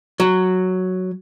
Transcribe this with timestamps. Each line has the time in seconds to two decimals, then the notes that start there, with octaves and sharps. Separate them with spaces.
0.20 F#3